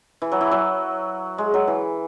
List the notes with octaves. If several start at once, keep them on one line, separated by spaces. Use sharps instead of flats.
E3
F#3
E3
F#3
G#3
F#3
E3